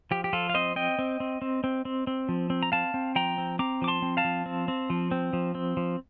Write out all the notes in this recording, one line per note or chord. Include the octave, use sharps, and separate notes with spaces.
F3 G4
G4
F3 F4 A4
F5
C4 C5 D#5
C4 D#5 G5
C4
C4
C4
C4
C4
C4
F3
C4
A#5
C4 F5 A5
C4
F3 G5 A#5
C4
C4 A#5 D6
F3 D6
A5 C6
C4
F5 A5
F3
C4
C4
F3
C4
F3
C4
F3